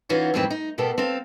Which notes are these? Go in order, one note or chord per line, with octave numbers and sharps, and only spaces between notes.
E3 C#4 D#4 F4 F#4
F2 G#2 E3 A3 C4 B4
D#4
B2 A#3 B3 G4 A4
C4 A4 F5